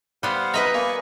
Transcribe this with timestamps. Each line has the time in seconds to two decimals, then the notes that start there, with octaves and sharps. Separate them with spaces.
0.23 G3 B3 C5 F5 F#5
0.54 B4 D#5 E5 A#5 B5
0.75 A#3 D5 G#5 C#6